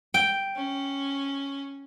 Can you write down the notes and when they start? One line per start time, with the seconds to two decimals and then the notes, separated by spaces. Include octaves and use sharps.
0.14 G5
0.56 C#4